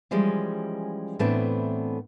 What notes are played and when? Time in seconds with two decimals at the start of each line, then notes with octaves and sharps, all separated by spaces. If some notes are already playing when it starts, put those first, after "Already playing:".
0.11 E3 F3 G3 G#3 C#4
1.19 A2 E3 A3 B3 C4 D4